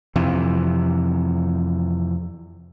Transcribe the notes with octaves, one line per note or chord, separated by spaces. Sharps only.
F2 C3 E3